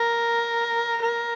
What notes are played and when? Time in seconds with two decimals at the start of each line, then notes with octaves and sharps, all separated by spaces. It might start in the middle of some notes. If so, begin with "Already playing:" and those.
Already playing: A#4
1.02 A#4